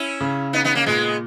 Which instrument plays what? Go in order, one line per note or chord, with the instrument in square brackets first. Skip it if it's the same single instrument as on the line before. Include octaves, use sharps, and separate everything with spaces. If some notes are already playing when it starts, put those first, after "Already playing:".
Already playing: [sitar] C#4 E4
[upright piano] C#3
[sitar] B3 D#4
B3 D#4
A#3 C#4
[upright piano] A#2 [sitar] G#3 B3